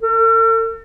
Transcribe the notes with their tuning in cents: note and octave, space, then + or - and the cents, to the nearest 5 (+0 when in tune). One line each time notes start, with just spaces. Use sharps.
A4 +45